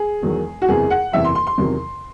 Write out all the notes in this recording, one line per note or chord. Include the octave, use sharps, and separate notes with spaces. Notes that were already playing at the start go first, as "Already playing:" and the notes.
Already playing: G#4
E1 E2 D#3 F#3
F#4
F#1 E2 C3 E3 G#4
F#5
F#1 E2 C3 E3 E5
C6
C6
C6
E2 C3 D#3 F#3